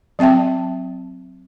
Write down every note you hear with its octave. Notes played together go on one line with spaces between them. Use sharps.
F#3 C4 E5 G5 A5